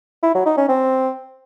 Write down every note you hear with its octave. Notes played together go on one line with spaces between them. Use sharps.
E4
F#3
D#4
C#4
C4